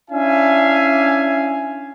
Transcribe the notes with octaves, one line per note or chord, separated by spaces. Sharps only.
C#4 D4 E4 E5 F5 G#5